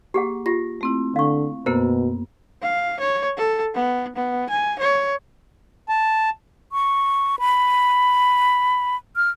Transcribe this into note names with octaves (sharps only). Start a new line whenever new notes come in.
A#3 G4 G#4 F#5
F4 G4 A#6
A3 C4 E4
D3 F5 C#6
F#2 B2 A#3 B3 A#4 C5
F5
C#5
A4
B3
B3
G#5
C#5
A5
C#6
B5
F6